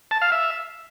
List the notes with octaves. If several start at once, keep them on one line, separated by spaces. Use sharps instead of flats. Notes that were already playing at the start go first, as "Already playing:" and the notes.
A5
F5
E5